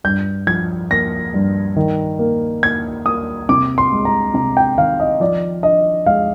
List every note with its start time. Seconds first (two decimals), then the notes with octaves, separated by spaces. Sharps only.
0.04 G2 G6
0.47 F3 G#6
0.91 A#3 A#6
1.34 G2
1.76 D#3
2.19 A#3
2.63 A#3 G#6
3.06 A#3 D#6
3.49 C3 D6
3.78 C6
3.92 G#3
4.05 A#5
4.34 C3 A#5
4.57 G5
4.77 D#3 F5
5.00 D#5
5.20 F3 D5
5.63 D4 D#5
6.06 G#3 F5